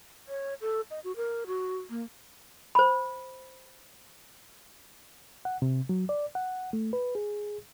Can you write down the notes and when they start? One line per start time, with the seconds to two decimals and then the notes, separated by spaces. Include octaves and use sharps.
0.28 C#5
0.61 A4
0.91 D#5
1.04 F#4
1.16 A#4
1.47 F#4
1.90 A#3
2.75 C5 B5
5.45 F#5
5.62 C3
5.89 F#3
6.09 D5
6.35 F#5
6.73 A3
6.93 B4
7.15 G#4